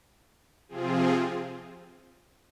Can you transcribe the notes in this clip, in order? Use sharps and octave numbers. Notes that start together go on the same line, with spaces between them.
C3 F3 C4 F4 G#4